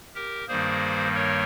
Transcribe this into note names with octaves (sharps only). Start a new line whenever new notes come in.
G4 A#4
G2 D#3 G3 A#3 G#4 C5
A#4 C#5